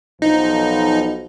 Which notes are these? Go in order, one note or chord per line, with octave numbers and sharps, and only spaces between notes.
B1 F3 D#4